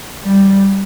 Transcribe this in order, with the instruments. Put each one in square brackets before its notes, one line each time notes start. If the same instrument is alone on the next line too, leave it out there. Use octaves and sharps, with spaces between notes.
[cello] G3